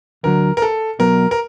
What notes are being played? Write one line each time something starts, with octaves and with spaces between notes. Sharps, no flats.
D2 D3 F#3 A#4
A#4
A4
B1 B2 F#3 A#4
A#4